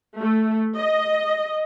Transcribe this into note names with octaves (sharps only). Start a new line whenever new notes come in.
A3
D#5